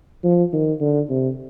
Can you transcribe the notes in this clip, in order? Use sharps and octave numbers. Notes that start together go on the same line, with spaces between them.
F3
D#3
D3
C3